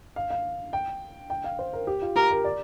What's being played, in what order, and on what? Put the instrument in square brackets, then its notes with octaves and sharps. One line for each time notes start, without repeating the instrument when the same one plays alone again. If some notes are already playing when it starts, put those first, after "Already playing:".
[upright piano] F5
F5
G5
G5
F5
C5
A#4
G4
F4
[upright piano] G4 [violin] A#4
[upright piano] A#4
D5